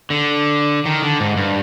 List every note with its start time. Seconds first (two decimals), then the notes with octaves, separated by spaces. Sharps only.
0.10 D3
0.86 D#3
1.02 D3
1.20 G#2
1.37 G2